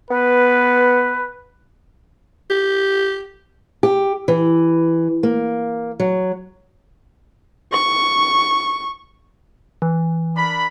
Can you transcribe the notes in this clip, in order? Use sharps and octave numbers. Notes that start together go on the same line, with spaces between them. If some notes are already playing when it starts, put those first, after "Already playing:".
B3 B4
G4
G4
E3
A#3
F#3
C#6
E3
D4 A#4 B5